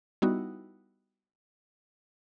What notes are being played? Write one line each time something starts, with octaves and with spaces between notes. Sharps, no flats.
G3 B3 D#4 E4 F#4